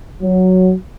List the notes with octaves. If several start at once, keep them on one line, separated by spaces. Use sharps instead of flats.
F#3